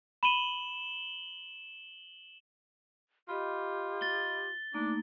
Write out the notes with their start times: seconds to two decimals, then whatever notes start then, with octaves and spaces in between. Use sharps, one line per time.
0.23 B5 D#7 E7 F#7 G7
3.29 F4 G4 D#5 B5
4.01 A6 G7
4.74 A3 A#3 D4 D#4 D6